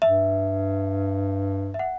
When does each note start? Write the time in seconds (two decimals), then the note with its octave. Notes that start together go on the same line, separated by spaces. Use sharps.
0.02 G2 E5
1.74 E5
1.79 F#5